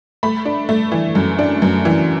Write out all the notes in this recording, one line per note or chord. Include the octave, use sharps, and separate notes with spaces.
A3 B5
D4
A3
E3
F#2
D4
F#2
E3